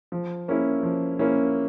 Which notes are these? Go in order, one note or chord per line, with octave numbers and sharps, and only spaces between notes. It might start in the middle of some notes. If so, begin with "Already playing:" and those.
F3
A#3 C#4 E4
F3
A#3 C#4 E4